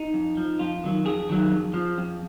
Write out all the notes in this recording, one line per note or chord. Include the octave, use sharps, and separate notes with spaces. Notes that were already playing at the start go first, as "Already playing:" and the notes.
Already playing: D#4
F2
F3
F2 F4
D#3 F#3
F2 G#4
D#3 F#3
F2
F3
F2